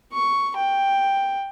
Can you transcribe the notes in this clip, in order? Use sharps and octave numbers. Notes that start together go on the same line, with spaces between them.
C#6
G5